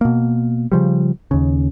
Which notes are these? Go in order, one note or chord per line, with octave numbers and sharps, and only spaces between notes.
B2 A#3
C#3 F3 G3
D#2 C#3